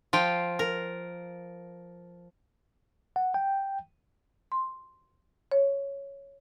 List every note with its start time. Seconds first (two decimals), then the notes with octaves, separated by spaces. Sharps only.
0.13 F3 F4 G5
0.59 A#4
3.16 F#5
3.34 G5
4.52 C6
5.52 C#5